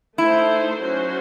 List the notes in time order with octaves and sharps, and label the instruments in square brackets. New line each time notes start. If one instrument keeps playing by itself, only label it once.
[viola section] A3 D#4 A4 C5 [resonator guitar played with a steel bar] E4
[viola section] F#3 C#4 F#4 C5